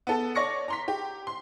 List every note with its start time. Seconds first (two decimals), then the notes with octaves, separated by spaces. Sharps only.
0.07 B3 A4 A5
0.35 C#5 D5 C#6 A#6 C#7
0.68 A#5 C6 B6
0.88 G4
1.27 C6